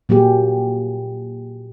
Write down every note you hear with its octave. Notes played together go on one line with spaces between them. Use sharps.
A#2 F#3 A#3 G4 G#4